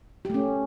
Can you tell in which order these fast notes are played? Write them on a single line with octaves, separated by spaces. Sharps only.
G4 A3 C#4